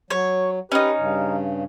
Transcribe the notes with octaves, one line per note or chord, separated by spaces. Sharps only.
F#3 C#5
C#4 D#4 G4 B4
G2 C#3